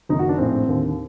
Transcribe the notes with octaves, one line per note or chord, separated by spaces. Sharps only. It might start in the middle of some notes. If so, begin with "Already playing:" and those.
F#1 F#2 D#3 D#4
F#4
D4
A#1 A2 C4
D#2 D3